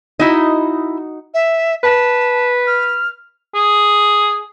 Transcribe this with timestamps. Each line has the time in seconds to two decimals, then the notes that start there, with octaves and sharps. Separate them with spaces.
0.20 D#4 E4 F#4 D#5
1.34 E5
1.84 B4 A5
2.67 F6
3.55 G#4